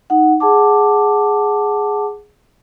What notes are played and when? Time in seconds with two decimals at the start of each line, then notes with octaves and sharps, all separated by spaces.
0.10 D#4 F#5
0.40 G#4 F#5 A5 D6